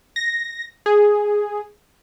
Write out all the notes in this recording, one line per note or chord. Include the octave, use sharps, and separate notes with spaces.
A#6
G#4